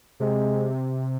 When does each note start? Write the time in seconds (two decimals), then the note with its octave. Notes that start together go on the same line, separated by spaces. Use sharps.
0.20 C3 G#3